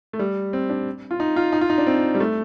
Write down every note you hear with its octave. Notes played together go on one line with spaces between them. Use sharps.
A3
G3
C4
D4
F4
D#4
F4
D#4
F4
D#4
D4
C4
G3
A3